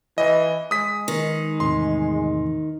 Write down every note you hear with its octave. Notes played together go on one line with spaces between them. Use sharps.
E3 D#5
G#3 D#6 B6
D#3
E2 A2 C3 C6